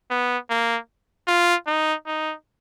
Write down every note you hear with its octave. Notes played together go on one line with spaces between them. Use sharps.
B3
A#3
F4
D#4
D#4